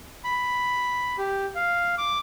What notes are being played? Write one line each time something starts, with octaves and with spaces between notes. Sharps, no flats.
B5
G4
F5
D6